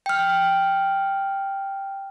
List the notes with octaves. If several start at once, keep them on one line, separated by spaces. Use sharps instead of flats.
G5 F6